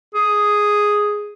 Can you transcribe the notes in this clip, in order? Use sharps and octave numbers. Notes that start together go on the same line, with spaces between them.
G#4